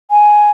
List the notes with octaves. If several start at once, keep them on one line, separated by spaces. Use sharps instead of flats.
G#5